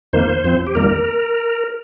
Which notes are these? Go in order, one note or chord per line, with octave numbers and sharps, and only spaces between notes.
F2 D#3 A#3 C5
F2 F3 C4
G4
F2 D#3 G3 A#3 A#4